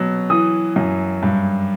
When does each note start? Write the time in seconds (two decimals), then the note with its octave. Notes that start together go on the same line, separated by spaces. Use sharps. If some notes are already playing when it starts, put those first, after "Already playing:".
Already playing: B2 F#3
0.30 E3 D#6
0.76 F#2
1.23 G2